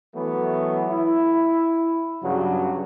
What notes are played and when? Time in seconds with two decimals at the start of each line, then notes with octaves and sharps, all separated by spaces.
0.15 E3 F#3 A3 B3
0.90 E4
2.23 G2 C#3 F#3